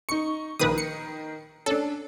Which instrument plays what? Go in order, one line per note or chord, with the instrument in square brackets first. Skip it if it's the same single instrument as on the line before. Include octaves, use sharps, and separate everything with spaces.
[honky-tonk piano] D#4 C#6 [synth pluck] C#7
[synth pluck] A#1 B4 D#6 [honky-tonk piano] D#3 A#4
[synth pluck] C#7
[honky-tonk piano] C#4 D4 [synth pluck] A4